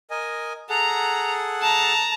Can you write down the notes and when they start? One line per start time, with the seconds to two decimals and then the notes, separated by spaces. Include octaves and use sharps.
0.10 A#4 D#5 G#5
0.70 G#4 A4 F#5 A#5
1.61 A5 A#5